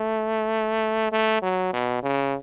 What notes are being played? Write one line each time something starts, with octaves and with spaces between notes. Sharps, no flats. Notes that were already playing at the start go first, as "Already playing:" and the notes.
Already playing: A3
A3
F#3
B2
C#3